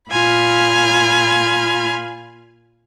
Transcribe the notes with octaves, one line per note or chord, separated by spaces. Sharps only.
A#2 F4 G#5 B5 F6